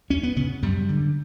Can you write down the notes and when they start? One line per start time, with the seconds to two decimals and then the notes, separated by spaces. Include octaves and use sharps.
0.10 E2 C#4
0.23 B3
0.36 C#3 B3
0.63 F#2 G3
0.89 D3